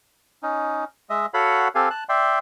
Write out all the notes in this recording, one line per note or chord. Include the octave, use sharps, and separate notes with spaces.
C#4 D#4
G#3 D#5 E5
F#4 A4 C#5 F5 F#5 B5
C4 G4 A4 F5 G#5
A5 F#6
D5 E5 G5 C6